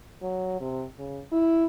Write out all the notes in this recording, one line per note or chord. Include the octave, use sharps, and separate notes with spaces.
F#3
C3
C#3
E4